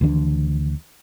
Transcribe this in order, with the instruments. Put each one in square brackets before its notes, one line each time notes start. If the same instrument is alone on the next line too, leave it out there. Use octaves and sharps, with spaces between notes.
[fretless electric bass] D2 D#3 E3 D4